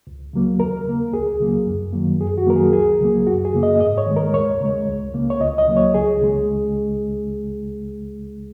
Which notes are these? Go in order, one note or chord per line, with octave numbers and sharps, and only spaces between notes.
C#2
C#3 F#3 A#3
D#2 A#4
C#3 A#3
C#2 G#4
C#3 F#3 A#3
F#2
D#3 F#3 A#3
F#2 G#4
F#4
D#3 F#3 A#3 A#4
G#4
C#2 G#4
C#3 F#3 A#3
F#2 F#4
G#4
C#3 A#3
D#5
G#2 D#5
C#5
D#3 G#3
A#4
D#2 C#5
C#3 G#3
C#2
C#3 A#3
C#5
C#2 D#5
D#5
C#3 F#3 A#3
C#5
C#2 G#4
C#3 G#3